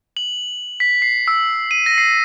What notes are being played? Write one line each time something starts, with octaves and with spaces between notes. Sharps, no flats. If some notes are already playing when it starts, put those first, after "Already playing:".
F#7
B6
C7
E6
D#7
A#6
C7